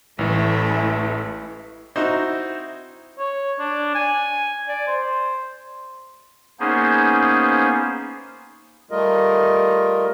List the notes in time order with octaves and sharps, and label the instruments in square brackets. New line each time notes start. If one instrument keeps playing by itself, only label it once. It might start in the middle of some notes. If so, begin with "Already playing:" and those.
[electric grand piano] A1 E3 [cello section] A3 E4
[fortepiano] C4 D#4 E4 F#4 C5
[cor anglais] C#5
D4
G#5
D5
C5
[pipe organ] A#3 B3 C#4 D#4 G#4 C5
[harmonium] G3 A3 F4 A#4 D#5